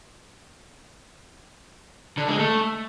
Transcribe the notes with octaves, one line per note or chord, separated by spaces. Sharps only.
D3
G#3
A3